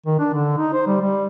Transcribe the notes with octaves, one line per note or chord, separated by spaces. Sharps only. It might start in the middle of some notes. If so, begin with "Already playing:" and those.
D#3
D4
D3
D#4
C5
G3
G3